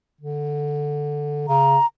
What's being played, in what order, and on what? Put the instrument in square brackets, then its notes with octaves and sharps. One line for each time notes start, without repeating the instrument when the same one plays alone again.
[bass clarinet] D3
[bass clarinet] C#3 [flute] A#5